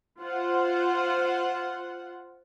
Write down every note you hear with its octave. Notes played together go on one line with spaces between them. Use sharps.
F4 C5 F#5